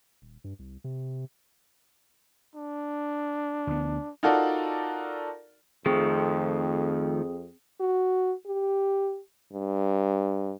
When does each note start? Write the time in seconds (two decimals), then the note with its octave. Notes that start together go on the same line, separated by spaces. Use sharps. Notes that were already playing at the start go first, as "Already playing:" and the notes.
0.22 D#1
0.44 G2
0.59 C2
0.84 C3
2.55 D4
3.67 D2 B3
4.23 D#4 F4 F#4 A4 A#4 D5
5.86 F2 D#3 F3 A3 C4 G#4
7.80 F#4
8.46 G4
9.53 G2